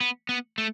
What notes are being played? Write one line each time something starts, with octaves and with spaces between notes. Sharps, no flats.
B3
B3
A3